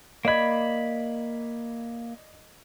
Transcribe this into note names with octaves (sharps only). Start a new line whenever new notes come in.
A#3 D5 D#5 B5 G#6